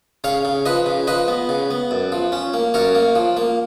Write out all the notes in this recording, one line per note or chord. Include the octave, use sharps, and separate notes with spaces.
C#3 C#5 F5
C#3
F3 B4 D#5
C#3
F3 B4 D#5
B3
C#3
B3
F#2
F3
C#4
A#3
F#2 A#4 C#5
A#3
F3
A#3